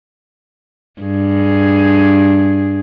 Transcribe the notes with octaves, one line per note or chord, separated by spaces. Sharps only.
G2 G#4